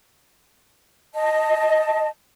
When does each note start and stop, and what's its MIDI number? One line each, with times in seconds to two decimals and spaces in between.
1.14 2.07 75
1.14 2.07 81